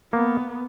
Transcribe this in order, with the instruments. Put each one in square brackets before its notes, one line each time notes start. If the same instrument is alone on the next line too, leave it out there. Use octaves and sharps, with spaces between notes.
[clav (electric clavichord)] A#3 [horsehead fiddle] B3